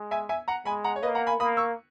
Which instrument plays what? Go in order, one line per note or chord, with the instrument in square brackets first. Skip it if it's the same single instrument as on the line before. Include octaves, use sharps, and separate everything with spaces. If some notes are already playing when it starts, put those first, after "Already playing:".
Already playing: [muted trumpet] G#3
[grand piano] E5 G#5
E5 G#5
F#5 A#5
[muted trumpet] G#3 [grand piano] G#5 B5
[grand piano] F#5 A#5
C#5
[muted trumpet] A#3 [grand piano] B4 D#5
[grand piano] F#5 A#5
G#5 B5
[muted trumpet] A#3 [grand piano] B5 D#6
[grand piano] C#6 E6